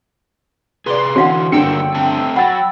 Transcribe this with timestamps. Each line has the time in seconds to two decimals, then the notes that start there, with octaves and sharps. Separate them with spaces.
0.86 C3 G#4 B4 D5 C6
1.16 D3 E3 C#4 F#4 F5 F#5
1.52 G1 F#2 D3 D#3 A#3 G5 E6 C#7
1.95 A3 C4 A5
2.36 F#3 F#5 B5 A6